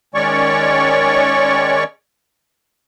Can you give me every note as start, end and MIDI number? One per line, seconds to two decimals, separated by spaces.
0.15 1.84 51
0.15 1.84 56
0.15 1.84 61
0.15 1.84 73
0.15 1.84 74
0.15 1.84 85